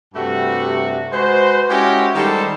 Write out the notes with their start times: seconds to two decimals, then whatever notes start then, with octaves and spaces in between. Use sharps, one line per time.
0.14 G2 C3 G3 A3 F#4
1.12 G#3 F#4 B4 C5
1.70 G#3 C#4 E4 F#4 G4 A#4
2.15 D#3 G3 G#3 G4 A4 C5